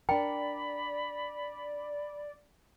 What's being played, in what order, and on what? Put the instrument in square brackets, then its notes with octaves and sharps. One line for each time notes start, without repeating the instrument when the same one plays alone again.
[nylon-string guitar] D4 A#4 [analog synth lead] D5 [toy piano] G5 [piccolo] B5